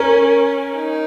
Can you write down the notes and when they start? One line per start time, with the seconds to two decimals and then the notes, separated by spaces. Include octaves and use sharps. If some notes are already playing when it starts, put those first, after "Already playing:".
Already playing: C#4 A#4
0.75 D#4